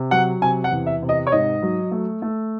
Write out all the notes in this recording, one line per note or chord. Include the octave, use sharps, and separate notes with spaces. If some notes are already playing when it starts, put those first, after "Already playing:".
Already playing: C3
F#3 F#5
C3 G#5
F#5
E2
E5
C3
D#5
C#5
G#2 D#5
F#3
A3
A3